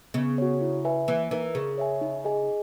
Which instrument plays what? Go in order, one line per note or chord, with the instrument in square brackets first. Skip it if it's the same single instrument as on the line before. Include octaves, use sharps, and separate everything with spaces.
[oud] C#3 [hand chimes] B3
[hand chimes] F#4 C#5
E4
B4 E5 G#5
[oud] E3 [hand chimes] A#3
[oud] E3 [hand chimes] D#4 A#4
[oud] C#3 [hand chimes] G#4
[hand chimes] C#5 E5 G#5
D#4
G#4 D#5 G#5